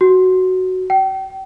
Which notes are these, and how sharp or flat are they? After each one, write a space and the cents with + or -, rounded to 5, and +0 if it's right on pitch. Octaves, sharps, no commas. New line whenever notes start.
F#4 +5
G5 -35